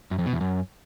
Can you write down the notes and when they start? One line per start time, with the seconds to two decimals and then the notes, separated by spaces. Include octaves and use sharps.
0.11 F#2
0.19 F2
0.26 B2
0.33 E2
0.41 F#2